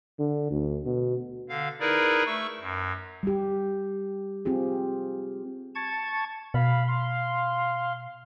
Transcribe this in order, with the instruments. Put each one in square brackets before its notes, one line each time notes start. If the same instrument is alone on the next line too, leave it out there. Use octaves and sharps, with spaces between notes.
[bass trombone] D3
D2
B2
[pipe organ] D3 F5
D#4 E4 G#4 A#4 B4 D5
A3 C#6 E6
F#2
[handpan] G3 G4
C4 F4 G4 G#4
[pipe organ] A5 C#6 G#6
[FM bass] B2 [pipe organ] F5 B5
[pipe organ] F5 C6